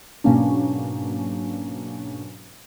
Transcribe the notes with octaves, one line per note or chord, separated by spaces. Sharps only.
G#2 B2 F#3 A#3 C#4 D4